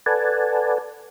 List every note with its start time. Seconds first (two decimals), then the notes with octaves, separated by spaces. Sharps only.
0.06 A4 B4 D5 F#5 G#5 A5